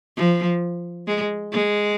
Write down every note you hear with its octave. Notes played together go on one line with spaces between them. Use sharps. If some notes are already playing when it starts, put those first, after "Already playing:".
F3
G#3
G#3